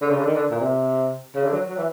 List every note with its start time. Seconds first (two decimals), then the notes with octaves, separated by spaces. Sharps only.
0.02 D3
0.10 C#3
0.19 D3
0.26 D#3
0.36 D3
0.51 A#2
0.61 C3
1.35 C#3
1.45 D3
1.53 F#3
1.69 F#3
1.77 E3